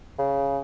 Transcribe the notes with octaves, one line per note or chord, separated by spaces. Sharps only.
C#3